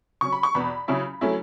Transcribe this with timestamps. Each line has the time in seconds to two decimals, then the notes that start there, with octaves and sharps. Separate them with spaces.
0.21 C#3 F#3 C#4 C#6
0.32 B5
0.43 C#6
0.55 E2 B2 B3 B5
0.88 C#3 F#3 C#4 E4
1.21 F#3 A3 C#4 E4